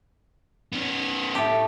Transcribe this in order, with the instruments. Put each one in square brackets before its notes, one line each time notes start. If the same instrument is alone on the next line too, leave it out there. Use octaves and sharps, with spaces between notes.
[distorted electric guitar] B3 C#4
[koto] A2 G4 [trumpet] A5